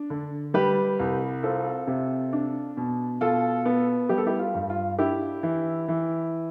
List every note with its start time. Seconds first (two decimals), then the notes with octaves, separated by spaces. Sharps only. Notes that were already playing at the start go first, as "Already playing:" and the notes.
Already playing: D4
0.10 D3
0.54 G3 G4 B4
0.99 C2
1.43 C4 F4 A4
1.87 C3
2.33 D4
2.77 B2
3.21 B2 F4 A4
3.66 B3
4.09 G3 G4
4.18 A4
4.27 E4 G4
4.39 F4
4.55 G2
4.70 F4
4.99 D4 E4 G4
5.43 E3
5.88 E3